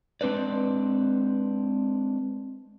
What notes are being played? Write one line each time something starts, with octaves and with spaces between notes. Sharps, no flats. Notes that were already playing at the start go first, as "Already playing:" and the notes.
G#3 C4 D4 B4 D5